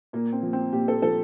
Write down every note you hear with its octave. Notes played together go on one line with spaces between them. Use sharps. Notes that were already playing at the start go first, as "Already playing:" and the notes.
A#2 A#3
C4
F3
C4
A#2 G4
A4
F3 A4